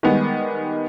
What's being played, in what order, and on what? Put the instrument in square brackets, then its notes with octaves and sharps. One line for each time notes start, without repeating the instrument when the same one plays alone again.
[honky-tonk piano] D#3 G3 G#3 B3